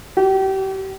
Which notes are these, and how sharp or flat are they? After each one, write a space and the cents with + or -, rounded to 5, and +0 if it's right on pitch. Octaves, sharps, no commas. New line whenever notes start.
G4 -35